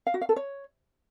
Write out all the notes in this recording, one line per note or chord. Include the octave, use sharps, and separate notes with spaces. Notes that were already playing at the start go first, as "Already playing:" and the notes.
F5
F#4
F5
A4
C#5